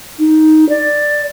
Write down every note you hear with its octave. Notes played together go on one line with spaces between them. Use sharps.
D#4
D5